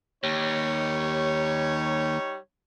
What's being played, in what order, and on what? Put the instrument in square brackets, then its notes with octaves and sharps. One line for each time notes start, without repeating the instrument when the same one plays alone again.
[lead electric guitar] D#2 [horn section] G3 D#4 C#5